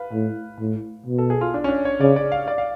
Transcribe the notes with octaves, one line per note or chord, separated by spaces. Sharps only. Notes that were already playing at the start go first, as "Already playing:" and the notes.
Already playing: B4 F5
A2
A2
B2
A4
G#4
F4
D4
C#4
D4
C#5
C#3 D5
D5
F5
D5
F5